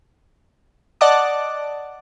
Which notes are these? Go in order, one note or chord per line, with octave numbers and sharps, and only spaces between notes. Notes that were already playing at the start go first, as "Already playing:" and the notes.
D5 D#5 F#5 A5 D6